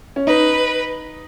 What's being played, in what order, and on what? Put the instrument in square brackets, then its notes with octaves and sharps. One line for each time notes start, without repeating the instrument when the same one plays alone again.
[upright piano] C#4
[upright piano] D#4 [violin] B4